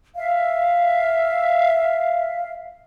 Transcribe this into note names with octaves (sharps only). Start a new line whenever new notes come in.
E5 F5